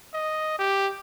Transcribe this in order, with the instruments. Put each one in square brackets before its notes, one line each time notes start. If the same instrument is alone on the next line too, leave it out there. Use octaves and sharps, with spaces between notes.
[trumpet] D#5
G4